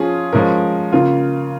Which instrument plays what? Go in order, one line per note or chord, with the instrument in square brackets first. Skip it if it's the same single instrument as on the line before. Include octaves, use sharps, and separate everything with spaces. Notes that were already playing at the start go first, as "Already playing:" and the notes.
Already playing: [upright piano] F3 C#4 F4 G#4
F3 G#3 C#4 A#4
C#3 A#3 F4